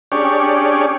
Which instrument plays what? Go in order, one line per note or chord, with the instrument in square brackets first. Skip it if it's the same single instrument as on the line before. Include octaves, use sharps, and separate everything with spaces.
[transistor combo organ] C#4 D4 G4 G#4 C#5 D5